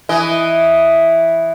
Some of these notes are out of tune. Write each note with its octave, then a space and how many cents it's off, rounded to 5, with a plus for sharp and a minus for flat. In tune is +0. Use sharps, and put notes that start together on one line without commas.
E3 +0 D#5 +0